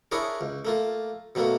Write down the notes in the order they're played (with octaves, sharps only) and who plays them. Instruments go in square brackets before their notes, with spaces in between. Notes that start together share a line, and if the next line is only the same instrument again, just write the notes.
[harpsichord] D4 E4 G#4 A#4 C#5
C#2
A3 A#3 F4
B2 F#3 A3 A#3